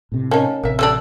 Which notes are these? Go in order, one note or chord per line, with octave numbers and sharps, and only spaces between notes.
A2 C3
C#4 D#4 A#4 F5 A5
A1 C3 A#4 E5
D3 G3 D4 E6